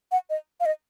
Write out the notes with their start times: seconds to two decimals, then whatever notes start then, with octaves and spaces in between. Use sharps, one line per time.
0.12 F#5
0.30 D#5
0.60 F5
0.66 D#5